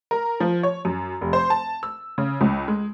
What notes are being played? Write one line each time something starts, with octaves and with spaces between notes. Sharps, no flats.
A#4
F3
C#5
F#2
F1
C5
A5
E6
C#3
C#2
G#3